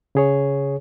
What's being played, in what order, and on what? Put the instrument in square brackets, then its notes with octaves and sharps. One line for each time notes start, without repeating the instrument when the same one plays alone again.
[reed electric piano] C#3 G#4 C#5